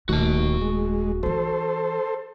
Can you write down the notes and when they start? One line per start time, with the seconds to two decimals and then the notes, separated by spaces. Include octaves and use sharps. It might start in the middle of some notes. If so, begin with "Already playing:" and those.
0.09 D#1 D#2 A3 F#4 A5
0.61 G#3
1.23 E3 D#4 A4 C5